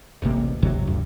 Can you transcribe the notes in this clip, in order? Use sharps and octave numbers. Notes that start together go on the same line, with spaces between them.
D1 A1 C3 A#3
G1 D2 C3 F#3
F#1 G2